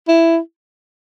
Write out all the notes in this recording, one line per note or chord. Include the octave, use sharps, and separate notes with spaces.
E4